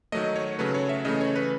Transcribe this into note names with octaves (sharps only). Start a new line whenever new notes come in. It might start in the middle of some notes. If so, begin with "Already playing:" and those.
D#3 F#3 A3 D#5
C#5
C#3 F#3 A3 B4
C#5
E5
C#3 E3 A3 D#5
C#5
B4